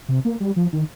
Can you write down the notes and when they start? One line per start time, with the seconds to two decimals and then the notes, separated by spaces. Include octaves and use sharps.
0.09 C3
0.25 A#3
0.40 G3
0.56 F3
0.73 D#3